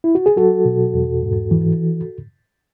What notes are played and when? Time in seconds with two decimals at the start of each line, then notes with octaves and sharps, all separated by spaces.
0.04 E4
0.15 F#4
0.26 G#4
0.36 F#3 F#4 A4
0.65 B2
0.94 E2
1.23 G#2
1.51 E3